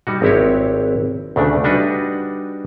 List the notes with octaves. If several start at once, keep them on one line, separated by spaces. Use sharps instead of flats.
G3 D#4 F#4
G#1 C4 E4 G4 C#5
D2 C#3 A3 D4
G3 D4 D#4 F#4 B4